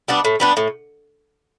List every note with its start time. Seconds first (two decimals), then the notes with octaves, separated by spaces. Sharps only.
0.08 G3 B3 D4
0.25 A2
0.40 G3 B3 D4
0.57 A2